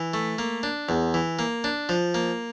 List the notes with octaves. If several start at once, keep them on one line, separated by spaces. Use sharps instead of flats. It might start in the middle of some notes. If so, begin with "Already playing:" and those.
Already playing: E3
A3
A#3
D4
E2
E3
A#3
D4
F3
A#3